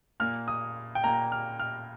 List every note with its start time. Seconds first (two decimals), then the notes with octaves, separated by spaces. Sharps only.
0.20 A#2 A#3 F6
0.48 D#6
0.95 G5
1.03 A#2 A#3 A#5
1.32 F6
1.60 F6